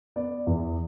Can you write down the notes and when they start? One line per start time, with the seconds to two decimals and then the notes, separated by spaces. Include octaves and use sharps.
0.16 B3 D5
0.47 E2